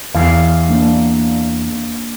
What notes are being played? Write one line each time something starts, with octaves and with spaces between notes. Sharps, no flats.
E2 F5
A#3 D4